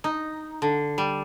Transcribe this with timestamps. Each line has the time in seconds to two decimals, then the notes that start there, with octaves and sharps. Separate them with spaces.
0.04 D#4
0.62 D3
0.98 G3